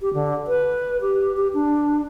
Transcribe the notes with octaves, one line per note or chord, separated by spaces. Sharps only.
G4
D3
B4
G4
G4
D4